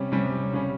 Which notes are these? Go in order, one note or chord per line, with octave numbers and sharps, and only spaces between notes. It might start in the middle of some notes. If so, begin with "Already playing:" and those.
Already playing: C3 G3 C#4
C3 G3 C#4
C#3 G3 C#4